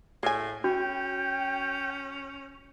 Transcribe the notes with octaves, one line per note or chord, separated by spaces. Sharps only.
A2 G#4 G#5
C#4 F#4 G5